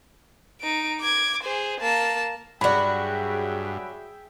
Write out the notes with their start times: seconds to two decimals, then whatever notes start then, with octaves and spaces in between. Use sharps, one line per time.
0.61 D#4 D7
1.00 D6 G#6
1.43 G#4 C5
1.81 A#3 A5
2.61 G2 F#3 F#4 G#4 D5 E5 G5 B5